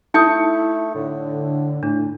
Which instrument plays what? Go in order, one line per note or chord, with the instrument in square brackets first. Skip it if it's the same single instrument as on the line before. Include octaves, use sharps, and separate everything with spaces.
[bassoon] A3 [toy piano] D#4 [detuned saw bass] E4 [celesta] D#6 G6 C#7
[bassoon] A2 [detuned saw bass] D3
[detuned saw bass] A2 [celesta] D4